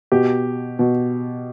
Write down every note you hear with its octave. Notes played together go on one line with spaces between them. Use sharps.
B2 G4
B2